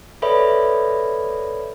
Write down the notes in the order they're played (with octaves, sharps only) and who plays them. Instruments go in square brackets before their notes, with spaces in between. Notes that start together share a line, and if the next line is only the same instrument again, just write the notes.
[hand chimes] A4 B4 C#5 D5 E5 B5